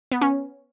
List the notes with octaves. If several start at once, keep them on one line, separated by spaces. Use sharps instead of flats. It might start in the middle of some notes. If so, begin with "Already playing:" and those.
B3
C#4